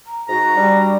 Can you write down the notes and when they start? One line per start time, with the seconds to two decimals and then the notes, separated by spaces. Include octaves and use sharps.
0.07 A#5
0.29 G#2 F#4 A#5
0.57 G3 D4